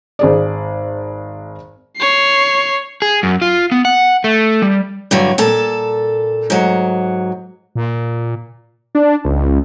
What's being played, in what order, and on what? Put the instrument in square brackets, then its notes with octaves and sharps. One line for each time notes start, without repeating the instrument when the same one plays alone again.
[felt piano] G#1 G#4 D5
[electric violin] C#5 C7
[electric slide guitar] G#4
F#2
F4
B3
F#5
A3
G3
[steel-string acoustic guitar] G2 D3 F#3
A#2 A4 A5
G#2 F#3
[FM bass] A#2
[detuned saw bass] D4
C#2